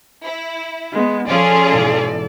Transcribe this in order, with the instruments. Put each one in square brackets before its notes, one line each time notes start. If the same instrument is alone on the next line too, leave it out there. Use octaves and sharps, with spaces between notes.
[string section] E4
[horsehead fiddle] G#3 B3
[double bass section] F3 [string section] C#4 F4 G#4 [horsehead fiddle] A4 D5
[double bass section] G#2 B2 E3